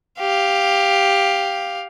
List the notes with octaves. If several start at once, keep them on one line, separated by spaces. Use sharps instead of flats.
G4 F5